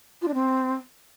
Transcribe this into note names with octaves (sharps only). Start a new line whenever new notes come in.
F4
D4
C4